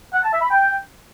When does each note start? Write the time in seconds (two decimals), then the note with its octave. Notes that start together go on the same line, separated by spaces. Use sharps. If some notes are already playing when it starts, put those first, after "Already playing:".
0.13 F#5
0.23 A5
0.32 E5
0.41 B5
0.51 G5